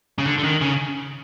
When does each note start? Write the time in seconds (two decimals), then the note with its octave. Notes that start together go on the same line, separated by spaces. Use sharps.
0.18 C#3
0.26 D3
0.39 D3
0.43 D#3
0.61 C#3